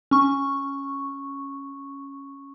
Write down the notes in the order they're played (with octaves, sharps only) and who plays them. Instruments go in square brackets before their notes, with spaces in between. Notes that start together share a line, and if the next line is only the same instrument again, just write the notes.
[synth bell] C#4 C#6